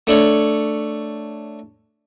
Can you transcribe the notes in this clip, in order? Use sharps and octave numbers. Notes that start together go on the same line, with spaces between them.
A3 D4 C#5